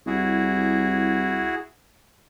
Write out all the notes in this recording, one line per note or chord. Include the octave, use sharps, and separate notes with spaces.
C2 E4 F#4 G#4